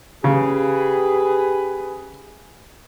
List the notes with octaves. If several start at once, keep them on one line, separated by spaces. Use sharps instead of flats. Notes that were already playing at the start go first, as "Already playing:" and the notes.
C#3 G4 G#4 B4